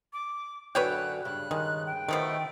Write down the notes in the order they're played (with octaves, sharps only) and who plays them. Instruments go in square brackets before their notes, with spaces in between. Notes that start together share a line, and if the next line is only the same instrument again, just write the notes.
[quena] D6
[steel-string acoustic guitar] F#2 D3 [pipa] B4 C#5 G5 [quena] F#6
[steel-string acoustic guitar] G2 C#3 [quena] F#6
[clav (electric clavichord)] D#3 [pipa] G#3
[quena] G5
[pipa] B2 F3 A3 [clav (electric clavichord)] D#3